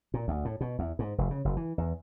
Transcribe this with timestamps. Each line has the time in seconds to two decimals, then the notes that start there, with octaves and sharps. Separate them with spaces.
0.14 A#2
0.28 D2
0.45 A2
0.61 B2
0.79 E2
0.99 G#2
1.18 F1
1.31 C#3
1.45 F#1
1.57 E3
1.78 E2